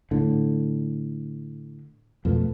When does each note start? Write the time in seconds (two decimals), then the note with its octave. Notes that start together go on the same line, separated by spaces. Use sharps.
0.11 A2 D3
2.25 F2 B2 A3